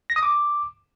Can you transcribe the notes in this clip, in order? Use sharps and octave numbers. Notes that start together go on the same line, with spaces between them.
A#6
D#6
D6